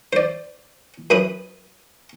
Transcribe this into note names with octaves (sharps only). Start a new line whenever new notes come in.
C5 D5
F#2 B4 B5 D#6